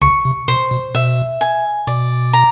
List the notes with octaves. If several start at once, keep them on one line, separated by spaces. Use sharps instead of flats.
C#2 C#3 C#6
C3
B2 C5
B2
B2 E5
G#5
B2 D5
A#5